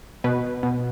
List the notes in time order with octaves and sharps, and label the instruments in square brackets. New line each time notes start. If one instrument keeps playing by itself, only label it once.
[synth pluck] B2 B4
B2